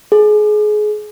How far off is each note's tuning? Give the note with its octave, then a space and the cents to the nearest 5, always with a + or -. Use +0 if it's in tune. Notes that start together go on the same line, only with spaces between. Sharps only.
G#4 +25